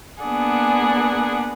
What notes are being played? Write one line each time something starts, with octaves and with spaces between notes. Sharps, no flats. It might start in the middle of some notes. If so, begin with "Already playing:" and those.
A#3 B3 D4 G#4 F#5